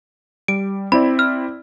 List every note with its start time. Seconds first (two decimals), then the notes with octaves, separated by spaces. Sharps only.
0.48 G3 D7
0.92 C4 E4 D5 B5
1.19 F6